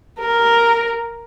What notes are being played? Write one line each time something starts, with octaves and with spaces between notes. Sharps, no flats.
A#4